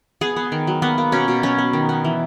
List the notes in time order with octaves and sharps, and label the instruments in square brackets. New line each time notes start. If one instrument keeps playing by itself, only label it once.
[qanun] B3 G#4
B3
D#3
F#3
A#3 B3
A#3
B2 C#4
B2
F#3 C#4
B3
D#3
B3
E3